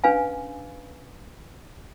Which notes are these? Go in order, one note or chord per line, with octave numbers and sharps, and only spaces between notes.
C#4 D4 B4 F5 G#5